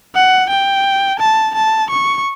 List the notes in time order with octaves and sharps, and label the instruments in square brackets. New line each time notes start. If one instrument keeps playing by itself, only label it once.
[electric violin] F#5
G5
A5
A5
C#6